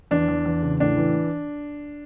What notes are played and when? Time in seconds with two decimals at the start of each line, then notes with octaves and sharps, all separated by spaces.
0.11 E2 D4
0.28 E2
0.45 E2
0.62 C#3
0.80 A2 D4
0.97 E3